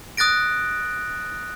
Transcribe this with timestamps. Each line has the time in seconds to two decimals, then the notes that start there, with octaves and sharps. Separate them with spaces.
0.17 D#6 F#6 A6 A#6 D7